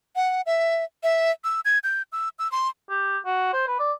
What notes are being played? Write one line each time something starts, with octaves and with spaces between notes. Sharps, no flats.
F#5
E5
E5
E6
G#6
G6
E6
E6
C6
G4
F#4
C5
B4
D5